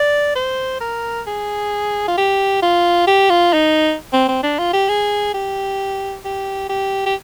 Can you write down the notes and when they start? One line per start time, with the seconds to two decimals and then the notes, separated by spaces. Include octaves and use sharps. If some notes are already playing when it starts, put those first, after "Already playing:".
Already playing: D5
0.35 C5
0.81 A#4
1.27 G#4
2.08 F4
2.17 G4
2.62 F4
3.07 G4
3.30 F4
3.53 D#4
4.13 C4
4.28 C4
4.43 D4
4.58 F4
4.73 G4
4.89 G#4
5.34 G4
6.25 G4
6.69 G4
7.06 G4